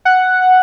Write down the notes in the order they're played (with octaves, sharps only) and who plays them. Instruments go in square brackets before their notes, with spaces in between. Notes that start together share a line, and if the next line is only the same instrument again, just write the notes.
[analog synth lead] F#5